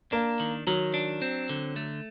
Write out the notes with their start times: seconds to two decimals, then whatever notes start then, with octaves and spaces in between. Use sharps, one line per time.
0.12 A#3 D4
0.40 D#3
0.67 D#3 F#3
0.94 D4
1.22 C4
1.49 D3
1.76 A3